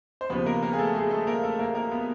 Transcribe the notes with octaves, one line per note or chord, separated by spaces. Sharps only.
C5
D#2 C#3 F3 B3 B4
A#3 A#4
A#3 A#4
G#4
A3 A4
G#3 G#4
A3 A4
A#3 A#4
A3 A4
A#3 A#4
A#3 A#4
B3 B4